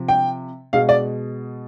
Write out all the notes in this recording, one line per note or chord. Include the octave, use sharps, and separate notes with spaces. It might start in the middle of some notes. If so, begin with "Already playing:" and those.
Already playing: C3 F3
G5
B2 G#3 F5
D5